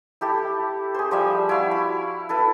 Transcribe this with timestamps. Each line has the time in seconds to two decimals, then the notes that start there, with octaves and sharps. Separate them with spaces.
0.21 E4 G4 A4
0.94 G#4 C5
1.11 F3 G3 E5
1.49 E4 F#4 F5
1.71 B5
2.29 E4 A4 B4